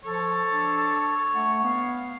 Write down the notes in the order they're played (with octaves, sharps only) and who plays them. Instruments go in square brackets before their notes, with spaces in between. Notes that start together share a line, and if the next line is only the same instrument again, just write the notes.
[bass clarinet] F3 [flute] A4 [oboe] C#5
[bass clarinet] D4
[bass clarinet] A3 [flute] F#5
[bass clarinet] B3 [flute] F5